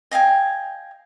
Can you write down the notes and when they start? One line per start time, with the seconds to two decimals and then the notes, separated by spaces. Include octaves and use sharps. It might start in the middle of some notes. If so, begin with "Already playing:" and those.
0.11 D#5 F5 G5 G#5